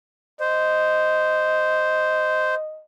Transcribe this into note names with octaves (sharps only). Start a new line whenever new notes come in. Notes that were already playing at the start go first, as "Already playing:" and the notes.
C5 D#5